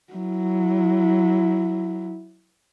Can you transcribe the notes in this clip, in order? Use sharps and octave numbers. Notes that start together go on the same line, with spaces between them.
F#3 E4